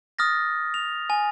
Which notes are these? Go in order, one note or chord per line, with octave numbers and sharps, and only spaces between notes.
D#6 F6 A6 A#6
F7
G#5